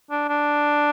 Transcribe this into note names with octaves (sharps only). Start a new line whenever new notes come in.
D4
D4